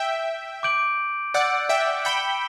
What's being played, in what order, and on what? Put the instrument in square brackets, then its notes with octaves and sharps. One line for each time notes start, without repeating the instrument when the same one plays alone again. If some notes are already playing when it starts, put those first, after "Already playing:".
Already playing: [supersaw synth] E5 G5
[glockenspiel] D6 G6 D7 F#7
[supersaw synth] D5 F#5 [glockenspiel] E6 G6 D7
[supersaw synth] E5 G5
[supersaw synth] G5 B5 [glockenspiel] G6 C#7 E7 G7